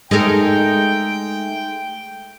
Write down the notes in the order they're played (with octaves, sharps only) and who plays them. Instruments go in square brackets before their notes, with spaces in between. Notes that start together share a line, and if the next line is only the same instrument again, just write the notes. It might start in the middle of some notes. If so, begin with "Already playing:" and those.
[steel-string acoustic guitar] G#3 A3 [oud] D#4 A4 A#4 [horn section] G5